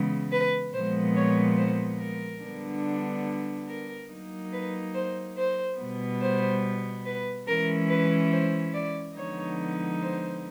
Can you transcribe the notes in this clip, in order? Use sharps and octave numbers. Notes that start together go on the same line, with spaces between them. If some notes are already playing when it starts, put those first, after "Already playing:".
Already playing: C#3 E3 G#3 B3
B4
A#2 F3 G#3 B3 C5
C#5
C5
A#4
D3 G3 B3 D4
A#4
F#3 A#3 D#4
B4
C5
C5
B2 G3 B3
C5
B4
E3 G#3 C#4 E4 A#4
B4
C5
D5
D3 F3 G#3 B3 D#4 C#5
C5